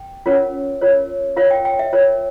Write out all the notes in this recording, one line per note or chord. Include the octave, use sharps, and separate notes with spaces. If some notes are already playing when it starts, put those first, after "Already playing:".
Already playing: G5
C#4 F4 A#4 C#5
F4 A#4 C#5
F4 A#4 C#5 F5
G5
G5
E5
F4 A#4 C#5